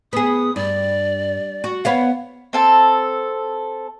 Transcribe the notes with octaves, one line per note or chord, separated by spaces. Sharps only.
B3 G#4 D#6
G2 D5
F#4
B3 C#5 F5 F#5
C4 A4 A5